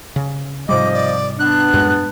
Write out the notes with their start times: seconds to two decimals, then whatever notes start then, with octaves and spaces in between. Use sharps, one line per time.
0.16 C#3
0.69 G#2 C3 F3 G3 D#5 D6
0.93 D5
1.39 B3 D4 F#6
1.74 F#2 A2 G#3